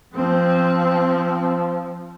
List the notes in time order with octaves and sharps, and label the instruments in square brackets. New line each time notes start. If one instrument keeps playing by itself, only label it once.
[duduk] F3 [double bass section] C4